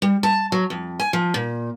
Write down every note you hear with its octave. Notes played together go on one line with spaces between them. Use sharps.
G3
A5
F#3
F2
G#5
F3
A#2